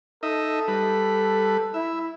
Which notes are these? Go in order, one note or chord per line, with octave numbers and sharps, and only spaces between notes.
D#4 A4 D#5 E5
G3 B4
E4 E5